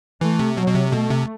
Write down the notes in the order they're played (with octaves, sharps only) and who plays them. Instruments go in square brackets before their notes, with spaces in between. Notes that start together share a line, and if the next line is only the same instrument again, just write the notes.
[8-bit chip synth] E3 [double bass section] A3
[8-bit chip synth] C3
[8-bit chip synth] B2 [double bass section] F#3
[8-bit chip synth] B2
C3
[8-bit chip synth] B2 [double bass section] A3
[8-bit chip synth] C3